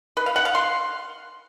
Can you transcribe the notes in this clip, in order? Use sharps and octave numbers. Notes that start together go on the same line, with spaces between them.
B4
F5
F#5
F5
C6